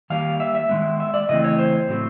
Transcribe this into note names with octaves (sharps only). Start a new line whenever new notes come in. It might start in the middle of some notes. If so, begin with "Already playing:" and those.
D#3 G3 A#3 F5
E5
E5
D#3 G#3 B3
E5
D5
C#3 E3 A3 C4 D#5
C#5
C5
A2 F#3 A3 C4